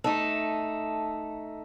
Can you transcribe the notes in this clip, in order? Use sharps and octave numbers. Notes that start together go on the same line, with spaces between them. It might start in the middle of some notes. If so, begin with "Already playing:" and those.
A3 D#4 A4